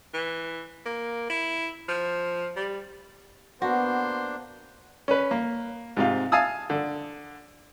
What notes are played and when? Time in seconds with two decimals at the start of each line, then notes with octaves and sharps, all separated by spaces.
0.14 E3
0.86 A#3
1.30 E4
1.88 F3
2.56 G3
3.62 A#3 B3 D4 F#4 C5
5.08 C#4 B4
5.31 A#3
5.97 G#2 C3 F4
6.32 F5 G#5 A5 D#6 E6
6.70 D3